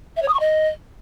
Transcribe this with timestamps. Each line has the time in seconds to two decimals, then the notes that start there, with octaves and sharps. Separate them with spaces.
0.17 E5
0.22 C#5
0.28 D#6
0.34 C#6
0.40 D#5